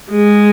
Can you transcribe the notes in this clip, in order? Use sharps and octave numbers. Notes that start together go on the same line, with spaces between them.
G#3